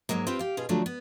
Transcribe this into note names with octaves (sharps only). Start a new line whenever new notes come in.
G#2 F3 F#3 G#3 A#3
C4 F4 G4 B4
G4 F5
B2 F4 G#4
D3 F3 F#3 A3 D4
B3